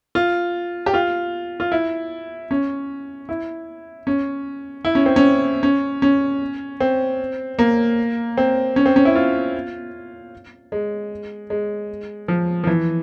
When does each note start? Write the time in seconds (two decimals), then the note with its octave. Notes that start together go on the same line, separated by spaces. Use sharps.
0.15 F4
0.86 G4
0.94 F4
1.60 F4
1.72 E4
2.51 C#4
3.29 E4
4.07 C#4
4.85 E4
4.95 C#4
5.06 C4
5.16 C#4
5.63 C#4
6.02 C#4
6.80 C4
7.59 A#3
8.37 C4
8.76 C#4
8.86 C4
8.96 C#4
9.05 E4
9.15 F4
10.72 G#3
11.50 G#3
12.28 F3
12.64 F3
12.67 E3